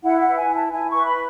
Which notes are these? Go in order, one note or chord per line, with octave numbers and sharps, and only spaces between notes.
E4 F#5
F#5
B4
G#5
E4
A5
E4 G#5
B4 C#6
B5